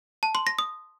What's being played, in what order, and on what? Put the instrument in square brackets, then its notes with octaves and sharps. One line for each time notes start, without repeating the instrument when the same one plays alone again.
[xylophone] A5
C6
A#6
D#6